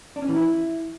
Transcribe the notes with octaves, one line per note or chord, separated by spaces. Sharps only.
D4
C#4
E3
E4